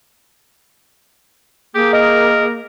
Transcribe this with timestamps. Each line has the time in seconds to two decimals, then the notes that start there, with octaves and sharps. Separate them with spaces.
1.75 A#3 G4 G#4
1.93 A#4 D#5